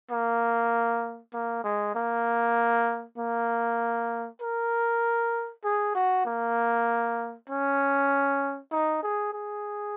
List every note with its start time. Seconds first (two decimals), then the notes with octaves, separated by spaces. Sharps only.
0.11 A#3
1.33 A#3
1.64 G#3
1.95 A#3
3.18 A#3
4.41 A#4
5.64 G#4
5.95 F#4
6.25 A#3
7.49 C#4
8.71 D#4
9.03 G#4
9.33 G#4